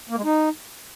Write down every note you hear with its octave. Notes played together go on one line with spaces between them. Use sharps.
A#3
G#3
D#4